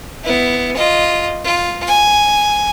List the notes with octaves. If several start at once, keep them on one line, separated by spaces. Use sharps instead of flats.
B3 E4
F4 D#5
F4
G#5